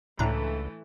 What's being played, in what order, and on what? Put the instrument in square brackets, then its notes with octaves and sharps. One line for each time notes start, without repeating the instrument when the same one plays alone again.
[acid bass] C#2 [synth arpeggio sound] A2 D4 A#5 [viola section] E3 A3